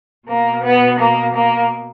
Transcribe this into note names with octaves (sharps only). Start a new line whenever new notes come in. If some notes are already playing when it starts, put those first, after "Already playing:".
B2 A#3
B3
A#3
A#3